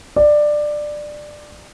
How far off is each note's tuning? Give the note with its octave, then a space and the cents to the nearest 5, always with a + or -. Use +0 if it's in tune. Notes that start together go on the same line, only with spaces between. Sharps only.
D5 +15